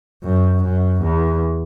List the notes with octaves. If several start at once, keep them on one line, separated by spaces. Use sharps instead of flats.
F#2
F#2
E2